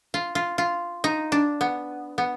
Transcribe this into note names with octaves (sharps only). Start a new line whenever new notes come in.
F4
F4
F4
D#4
D4
B3
B3